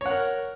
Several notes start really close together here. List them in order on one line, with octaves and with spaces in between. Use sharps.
C#5 F#5 A#4